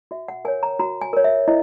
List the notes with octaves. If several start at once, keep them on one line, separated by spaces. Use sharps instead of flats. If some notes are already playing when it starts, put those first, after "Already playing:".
F#4 E5
F#5
A#4 C#5 G#5
A#5
F#4 A#5
G#5
A#4 C#5
E5
E4 D#5